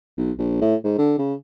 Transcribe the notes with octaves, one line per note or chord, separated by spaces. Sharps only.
B1
A#1
A2
G#2
D3
C#3